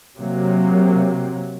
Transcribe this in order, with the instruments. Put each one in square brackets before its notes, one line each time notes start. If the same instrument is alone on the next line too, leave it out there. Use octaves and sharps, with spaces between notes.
[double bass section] C3 F#3 A#3